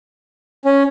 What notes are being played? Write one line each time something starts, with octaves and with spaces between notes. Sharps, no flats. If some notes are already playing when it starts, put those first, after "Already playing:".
C#4